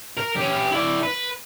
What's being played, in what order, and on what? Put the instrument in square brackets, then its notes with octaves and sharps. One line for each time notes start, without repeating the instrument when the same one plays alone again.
[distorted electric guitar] A#4
C#4 G4
E4 D5
B4